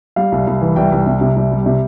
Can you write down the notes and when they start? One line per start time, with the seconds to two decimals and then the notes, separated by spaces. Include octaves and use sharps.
0.16 G3 F5
0.32 C2
0.47 C2
0.61 E3
0.76 C2 G5
0.92 C2
1.06 C3
1.21 C3
1.36 C2
1.51 G3
1.66 C3